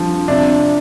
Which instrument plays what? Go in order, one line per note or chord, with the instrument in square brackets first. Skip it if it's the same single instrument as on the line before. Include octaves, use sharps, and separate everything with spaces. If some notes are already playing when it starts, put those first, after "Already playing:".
Already playing: [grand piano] D3 F3 G3
[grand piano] C3 [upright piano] D4